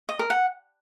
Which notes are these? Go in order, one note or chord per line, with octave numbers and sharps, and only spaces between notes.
D#5
A#4
F#5